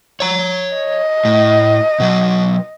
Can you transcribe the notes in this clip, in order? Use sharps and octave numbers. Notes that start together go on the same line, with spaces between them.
C#5 A#5
D#5
A2
B2 F#3